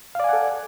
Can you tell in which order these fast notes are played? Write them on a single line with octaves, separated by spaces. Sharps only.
F5 D5 G#5 F#5 A4